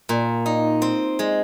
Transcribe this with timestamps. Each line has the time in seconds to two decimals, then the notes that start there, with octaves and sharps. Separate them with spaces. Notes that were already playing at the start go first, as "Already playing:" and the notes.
0.09 A#2
0.46 D#4
0.82 C4
1.19 G#3